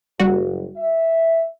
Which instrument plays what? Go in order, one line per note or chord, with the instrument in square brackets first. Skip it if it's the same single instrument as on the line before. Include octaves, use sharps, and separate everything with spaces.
[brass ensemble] F#1 [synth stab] G3 F#4
[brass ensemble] E5